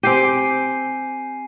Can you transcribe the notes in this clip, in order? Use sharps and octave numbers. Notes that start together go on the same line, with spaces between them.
C4 G4 G#5 C7 D#7